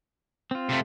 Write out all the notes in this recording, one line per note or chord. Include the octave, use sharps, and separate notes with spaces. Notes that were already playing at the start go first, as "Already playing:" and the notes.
C4 F4
C3 A3